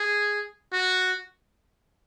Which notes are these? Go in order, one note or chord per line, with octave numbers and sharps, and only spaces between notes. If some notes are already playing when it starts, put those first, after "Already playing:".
Already playing: G#4
F#4